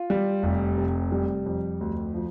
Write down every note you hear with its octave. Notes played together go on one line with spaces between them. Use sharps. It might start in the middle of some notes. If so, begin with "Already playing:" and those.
Already playing: F4
G3
F1
C3
G3
F2
D2
F3